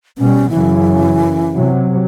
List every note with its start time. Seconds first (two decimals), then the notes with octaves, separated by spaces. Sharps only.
0.18 B2 G3 C#4
0.50 F#2 C#3 E3
1.56 C3 F#3